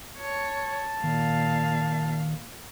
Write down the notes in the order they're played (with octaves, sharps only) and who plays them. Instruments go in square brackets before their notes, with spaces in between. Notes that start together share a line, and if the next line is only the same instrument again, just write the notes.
[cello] C#5 [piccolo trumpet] A5
[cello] A#2 F5 [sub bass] D#3